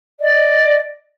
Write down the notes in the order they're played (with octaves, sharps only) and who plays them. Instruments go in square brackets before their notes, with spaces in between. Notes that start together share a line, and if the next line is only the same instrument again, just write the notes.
[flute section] D5 D#5